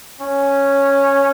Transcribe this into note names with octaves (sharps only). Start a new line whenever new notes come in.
C#4